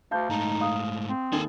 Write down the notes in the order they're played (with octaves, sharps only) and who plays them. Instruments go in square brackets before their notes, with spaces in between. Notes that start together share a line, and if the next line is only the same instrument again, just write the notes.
[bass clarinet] D2 [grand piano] F5 A5 G6
[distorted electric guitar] G#2 A3 [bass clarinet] D#4
[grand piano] F5 D#6
[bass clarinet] C4
[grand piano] D#2 [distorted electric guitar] A4 G#5